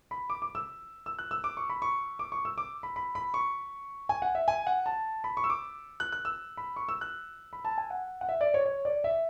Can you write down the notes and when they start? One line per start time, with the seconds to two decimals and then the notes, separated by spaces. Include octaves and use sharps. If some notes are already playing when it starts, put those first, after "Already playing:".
0.11 B5
0.30 D6
0.42 D6
0.55 E6
1.06 E6
1.19 F#6
1.31 E6
1.44 D6
1.57 C#6
1.70 B5
1.82 C#6
2.19 D6
2.32 C#6
2.45 E6
2.58 D6
2.83 B5
2.96 B5
3.15 B5
3.34 C#6
4.09 G#5
4.22 F#5
4.35 E5
4.48 G#5
4.67 F#5
4.86 A5
5.24 B5
5.37 C#6
5.44 E6
5.50 D6
6.00 F#6
6.12 F#6
6.25 E6
6.57 B5
6.76 C#6
6.89 E6
7.01 F#6
7.53 B5
7.65 A5
7.78 G#5
7.90 F#5
8.21 F#5
8.29 E5
8.41 D5
8.54 C#5
8.66 C#5
8.85 D5
9.04 E5